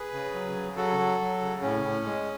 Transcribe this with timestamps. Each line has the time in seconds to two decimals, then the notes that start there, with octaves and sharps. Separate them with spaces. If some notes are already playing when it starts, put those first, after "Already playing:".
Already playing: G#4 B4
0.13 C#3
0.34 F#3
0.56 C#3
0.76 F#3 F#4 A4
0.99 F#3
1.20 F#3
1.41 C#3
1.62 A2 C#4
1.84 A2
2.05 G#3